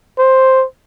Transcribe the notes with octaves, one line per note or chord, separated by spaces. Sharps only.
C5